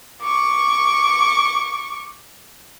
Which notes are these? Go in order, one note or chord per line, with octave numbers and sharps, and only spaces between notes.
C#6 D6